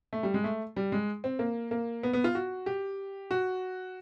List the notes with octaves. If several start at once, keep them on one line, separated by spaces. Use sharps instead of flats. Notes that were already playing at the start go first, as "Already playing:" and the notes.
A3
G3
G#3
A3
G3
G#3
C4
A#3
A#3
B3
B3
F4
F#4
G4
F#4